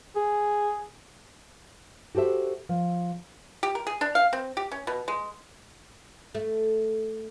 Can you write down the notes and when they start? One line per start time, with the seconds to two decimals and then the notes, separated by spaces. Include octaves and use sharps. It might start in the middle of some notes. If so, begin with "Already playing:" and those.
0.16 G#4
2.15 F#4 G4 A4 C5 E5
2.69 F3
3.63 G4
3.75 A#4
3.87 G#4
4.01 D4
4.15 F5
4.33 C4
4.57 G4
4.72 C#4
4.87 B2
5.08 G#3
6.35 A3